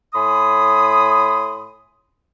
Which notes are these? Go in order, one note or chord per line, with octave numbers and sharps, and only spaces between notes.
A2 G#5 B5 C6 D#6